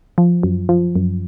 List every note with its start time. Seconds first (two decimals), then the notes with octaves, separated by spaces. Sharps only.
0.18 F3
0.43 F#2
0.69 F3
0.96 F#2